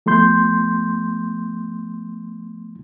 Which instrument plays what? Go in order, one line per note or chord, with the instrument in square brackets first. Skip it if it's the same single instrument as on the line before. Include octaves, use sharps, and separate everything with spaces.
[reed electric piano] F3 A3 B3 C6 G6